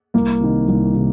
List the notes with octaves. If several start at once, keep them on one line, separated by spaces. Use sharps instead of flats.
C2 A#3
C3 D#3
C2
C3 D#3